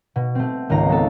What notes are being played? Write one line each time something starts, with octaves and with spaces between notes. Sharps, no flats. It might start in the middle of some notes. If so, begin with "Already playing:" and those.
B2
A3 C4
G#1 C#2 A#3 F4 A#5
G#3 B3 A4